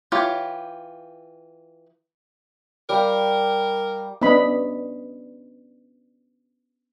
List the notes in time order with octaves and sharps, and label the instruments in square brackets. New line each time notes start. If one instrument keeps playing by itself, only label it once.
[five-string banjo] E3 F4 G4 C#5
[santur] G3 F5 [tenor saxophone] A#4
[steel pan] B3 C#4 D4 D#5 B5